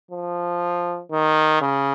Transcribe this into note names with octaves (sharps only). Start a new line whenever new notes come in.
F3
D#3
C#3